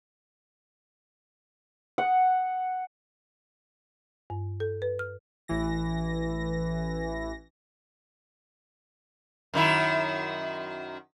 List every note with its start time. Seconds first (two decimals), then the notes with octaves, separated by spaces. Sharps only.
1.98 F#5
4.30 G2
4.60 A4
4.82 B4
4.99 F6
5.48 A1 E3 A#6
9.54 F#2 D#3 E4